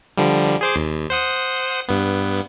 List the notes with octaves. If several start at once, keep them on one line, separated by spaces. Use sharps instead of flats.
D3 F3 G3
G#4 C5 D6
D#2
C5 F#5 D#6
G2 B3